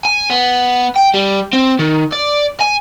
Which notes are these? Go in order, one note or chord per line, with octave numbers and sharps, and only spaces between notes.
G#5
B3
G5
G3
C4
D#3
D5
G#5